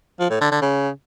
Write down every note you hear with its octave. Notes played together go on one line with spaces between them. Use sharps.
F3
A2
D3
D3
C#3